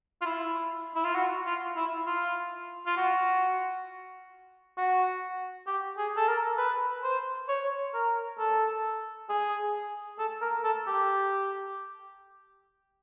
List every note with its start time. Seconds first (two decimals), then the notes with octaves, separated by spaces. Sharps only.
0.21 F4
0.25 E4
0.95 E4
1.05 F4
1.15 F#4
1.46 F4
1.76 E4
2.06 F4
2.86 F4
2.97 F#4
4.77 F#4
5.67 G4
5.98 G#4
6.17 A4
6.28 A#4
6.58 B4
7.03 C5
7.49 C#5
7.94 A#4
8.39 A4
9.29 G#4
10.19 A4
10.42 A#4
10.64 A4
10.87 G4